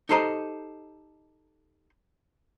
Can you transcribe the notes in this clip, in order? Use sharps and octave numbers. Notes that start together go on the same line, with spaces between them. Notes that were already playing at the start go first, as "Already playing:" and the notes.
D#4 G4 A4 C5 D#5 A#5